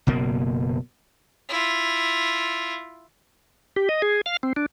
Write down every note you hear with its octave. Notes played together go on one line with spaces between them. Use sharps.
F#1 B2 A#3
E4 F4
G4
D#5
G#4
F5
C4
D4